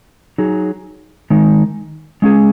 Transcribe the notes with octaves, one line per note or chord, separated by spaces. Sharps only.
F#3 D#4 G#4
D#3 G#3 D#4
G#3 C#4 G#4